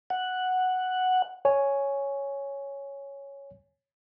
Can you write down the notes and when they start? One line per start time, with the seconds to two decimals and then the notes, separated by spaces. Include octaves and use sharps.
0.10 F#5
1.45 C#5 G#5